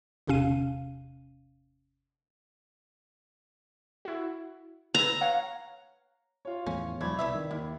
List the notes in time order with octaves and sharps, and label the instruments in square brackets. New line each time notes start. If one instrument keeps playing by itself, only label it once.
[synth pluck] G1 E2 C3 C#4 F5 D#7
E4 F#4
[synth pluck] B4 E6 [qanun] A#5
[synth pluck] C#5 F5 F#5
[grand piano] F4 C#5
[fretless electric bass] E2 A2 F3 [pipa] C#4
[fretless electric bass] E1 B1 F3 [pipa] A3 [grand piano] D5 B5 G#6
[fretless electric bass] C2 [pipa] E4 B4 E5
[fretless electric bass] D#3
[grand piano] D#2 [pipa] E4